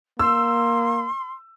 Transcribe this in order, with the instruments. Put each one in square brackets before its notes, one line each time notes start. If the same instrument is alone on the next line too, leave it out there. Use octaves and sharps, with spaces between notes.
[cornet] A#3 [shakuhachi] C6 [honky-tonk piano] E6